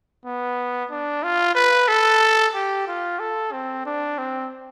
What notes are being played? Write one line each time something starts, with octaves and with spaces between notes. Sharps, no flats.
B3
D4
F4
B4
A4
G4
F4
A4
C4
D4
C4